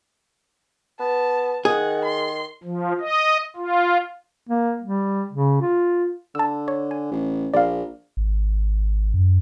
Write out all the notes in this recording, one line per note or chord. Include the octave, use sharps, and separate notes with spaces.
B3 A5
D#3 G#4 F#5
C6
F3
D#5
F4
A#3
G3
C#3
F4
D3 A5 E6
C#5
G#5
A1
A#1 D5 F5
G#1
F#2